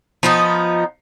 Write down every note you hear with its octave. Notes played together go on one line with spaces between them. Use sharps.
F3 B3 D#4